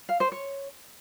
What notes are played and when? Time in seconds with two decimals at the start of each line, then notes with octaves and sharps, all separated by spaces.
0.09 F5
0.20 C5
0.32 C#5